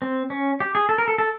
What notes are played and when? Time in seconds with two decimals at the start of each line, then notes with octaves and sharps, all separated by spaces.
0.02 C4
0.30 C#4
0.60 G4
0.75 G#4
0.89 A4
0.98 A#4
1.08 A4
1.18 A4